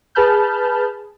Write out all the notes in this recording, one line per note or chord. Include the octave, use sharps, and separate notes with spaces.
G#4 B4 A5 B5 F6 G6